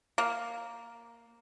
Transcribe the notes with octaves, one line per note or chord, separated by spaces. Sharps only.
A#3